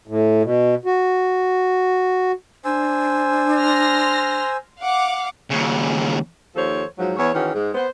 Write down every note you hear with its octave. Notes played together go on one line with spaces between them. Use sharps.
A2
B2
F#4
D4 C5 G#5 E6
C6 F6 A#6
F5 F#5 D6
D#2 C#3
D#2 F3 A4 C5 C#5
G#2 F3 F#3
E2 C#5
D#3 E3 C#4 F#4 G#4
G#2 G#3
B3 C5